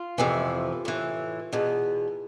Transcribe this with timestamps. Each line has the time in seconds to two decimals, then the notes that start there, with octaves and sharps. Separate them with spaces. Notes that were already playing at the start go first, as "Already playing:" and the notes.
Already playing: F4
0.18 F2 C3 E3
0.85 A2 E3
1.53 E2 B2